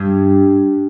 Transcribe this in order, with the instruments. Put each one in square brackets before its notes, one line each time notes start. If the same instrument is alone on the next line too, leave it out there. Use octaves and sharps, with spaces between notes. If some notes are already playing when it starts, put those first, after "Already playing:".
Already playing: [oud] G2